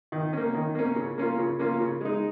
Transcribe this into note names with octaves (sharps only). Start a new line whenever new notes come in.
D#3
A#3 C#4
D#3
A#3 C#4
C#3
A#3 C#4 F4
C#3
A#3 C#4 F4
C#3
G#3 D#4